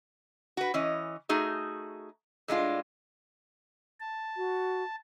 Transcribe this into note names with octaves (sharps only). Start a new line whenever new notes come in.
F#4 B4
E3 C#4 D#5
A3 D#4 F#4 G#4
A2 G#3 D4 F4
A5
F#4